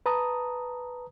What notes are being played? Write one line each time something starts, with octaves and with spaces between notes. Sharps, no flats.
B4 A5 A#5 D#6